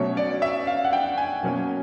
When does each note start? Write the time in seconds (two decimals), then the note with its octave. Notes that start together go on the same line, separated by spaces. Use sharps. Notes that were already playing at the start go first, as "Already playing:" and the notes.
Already playing: B2 F#3 A3 C#4 C#5
0.17 D5
0.42 E5
0.67 F5
0.84 F#5
0.93 G5
1.18 G#5
1.43 B2 F#3 A#3 C#4